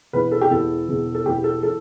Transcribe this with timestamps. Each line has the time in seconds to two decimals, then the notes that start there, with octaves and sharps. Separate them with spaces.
0.13 E1 E2 E3 B4
0.32 A4
0.41 G4
0.51 E1 E2 E3 A4
0.88 E1 E2 E3
1.15 A4
1.26 E1 E2 E3 G4
1.44 A4
1.63 E3 A4